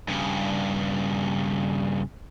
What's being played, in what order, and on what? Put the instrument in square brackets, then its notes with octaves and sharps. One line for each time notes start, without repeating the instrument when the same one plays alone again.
[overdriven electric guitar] G2 C#3